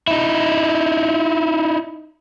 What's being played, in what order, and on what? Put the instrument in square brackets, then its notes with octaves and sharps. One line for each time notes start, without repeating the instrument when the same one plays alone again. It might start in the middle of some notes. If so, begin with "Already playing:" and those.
[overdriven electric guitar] D#4 E4